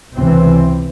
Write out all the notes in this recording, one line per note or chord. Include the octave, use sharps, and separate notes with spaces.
C#2 C3 E3 C4